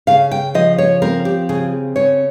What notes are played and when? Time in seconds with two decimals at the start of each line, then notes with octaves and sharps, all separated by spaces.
0.07 C#3 F5
0.31 G5
0.55 F3 D#5
0.78 C#5
1.02 C4 A#4
1.25 G4
1.49 C#3 G#4
1.96 C#3 C#5